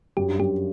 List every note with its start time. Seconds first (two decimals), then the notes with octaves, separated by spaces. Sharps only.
0.17 F#2 G4
0.28 G2
0.39 F#2 G4